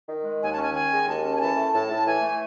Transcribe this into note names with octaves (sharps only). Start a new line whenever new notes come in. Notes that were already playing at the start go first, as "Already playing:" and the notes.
D#3
G#3
D#2 G#5
A5
C#4 G#5
D#3 G#5
G#3
D#2 A5
C#4
G#5
E3 A5
A3
A2 A5
A2
E3 G#5
A3